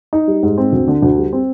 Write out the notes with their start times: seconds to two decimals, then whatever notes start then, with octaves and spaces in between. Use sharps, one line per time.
0.13 D#4
0.28 G3
0.43 G#2
0.58 C4
0.73 D2
0.88 D3
1.02 D2
1.18 G3
1.33 C4